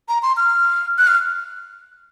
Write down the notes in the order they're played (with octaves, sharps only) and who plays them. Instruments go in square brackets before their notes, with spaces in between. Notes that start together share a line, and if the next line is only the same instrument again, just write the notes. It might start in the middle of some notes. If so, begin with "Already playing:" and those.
[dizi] A#5
C6
F6
F#6
F6